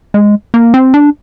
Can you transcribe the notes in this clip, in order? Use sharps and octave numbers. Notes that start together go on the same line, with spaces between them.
G#3
A#3
C4
D4